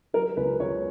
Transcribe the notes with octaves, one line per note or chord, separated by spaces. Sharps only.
F#3 A#4
C#2 B4
C#2 C#5